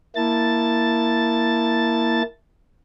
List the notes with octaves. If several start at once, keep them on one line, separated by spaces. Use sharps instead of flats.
A#3 E4 A5 A6